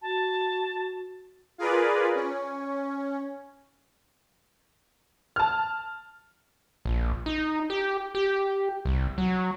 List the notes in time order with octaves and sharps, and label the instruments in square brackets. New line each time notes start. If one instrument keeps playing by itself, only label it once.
[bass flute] F#4 [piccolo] A5
[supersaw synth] F4 G#4 A#4 B4 D5
C#4
[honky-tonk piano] A5 F6
[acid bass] A#1
D#4
G4
G4
C2
F#3